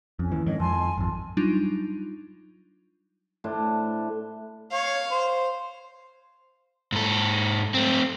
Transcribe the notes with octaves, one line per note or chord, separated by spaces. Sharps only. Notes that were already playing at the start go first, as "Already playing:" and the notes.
F2 C#4
D#2 E3
F2 G#2 D#3 C#5 D#5
F2 G#5 A5 C6
G#1 F2
F#3 G3 D4 D#4 F4
A2 D4 C5
C#5 F5
C5
G#2 A4
A3 C4